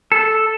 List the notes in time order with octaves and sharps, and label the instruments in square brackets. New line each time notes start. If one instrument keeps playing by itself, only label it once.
[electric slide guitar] A4